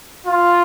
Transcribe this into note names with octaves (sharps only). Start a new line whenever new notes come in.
F4